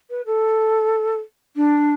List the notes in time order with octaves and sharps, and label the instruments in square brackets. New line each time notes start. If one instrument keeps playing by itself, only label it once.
[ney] B4
A4
D4